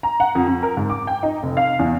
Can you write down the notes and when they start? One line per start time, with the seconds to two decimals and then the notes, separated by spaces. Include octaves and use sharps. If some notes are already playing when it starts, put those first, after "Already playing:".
0.03 A#5
0.20 F#5
0.35 F2
0.47 F2
0.63 A#4
0.77 G#2
0.90 D6
1.07 G5
1.23 D#4
1.43 F1
1.57 F5
1.79 E2